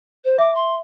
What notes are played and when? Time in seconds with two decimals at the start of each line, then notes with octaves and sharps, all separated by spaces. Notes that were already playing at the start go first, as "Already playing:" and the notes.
0.24 C5
0.38 E5 D6
0.54 C6